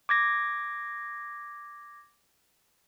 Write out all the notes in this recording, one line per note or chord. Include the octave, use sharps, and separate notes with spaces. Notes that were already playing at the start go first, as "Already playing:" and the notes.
D6 G#6 A#6